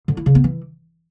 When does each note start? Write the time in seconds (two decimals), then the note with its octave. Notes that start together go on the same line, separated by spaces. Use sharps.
0.08 D3
0.17 E4
0.26 C#3
0.35 B3
0.44 E3